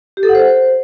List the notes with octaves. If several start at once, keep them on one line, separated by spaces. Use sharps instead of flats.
G4
A4
F#5
C5